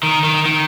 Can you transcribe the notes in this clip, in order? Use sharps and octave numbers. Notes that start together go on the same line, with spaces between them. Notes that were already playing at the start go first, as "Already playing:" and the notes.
D#3
D#3
D#3